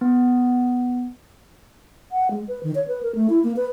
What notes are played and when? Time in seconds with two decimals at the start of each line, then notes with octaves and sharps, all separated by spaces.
0.01 B3
2.12 F#5
2.31 G#3
2.48 B4
2.63 D#3
2.75 C#5
2.88 B4
3.03 A#4
3.15 A3
3.30 E4
3.44 A#3
3.57 B4